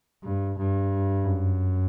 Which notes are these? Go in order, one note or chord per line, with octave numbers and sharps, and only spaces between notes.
G2
G2
F#2